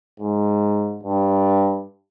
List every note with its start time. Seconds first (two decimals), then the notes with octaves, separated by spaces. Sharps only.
0.20 G#2
1.03 G2